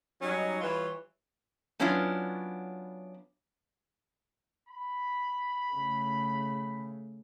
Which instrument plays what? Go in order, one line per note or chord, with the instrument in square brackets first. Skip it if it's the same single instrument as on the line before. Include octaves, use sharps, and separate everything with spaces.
[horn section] F#3 G3 C#4 D#4
E3 G3 F4 B4 C#5
[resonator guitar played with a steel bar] F#3 B3 C#4 D4 E4 F4
[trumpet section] B5
[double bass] C#3 A3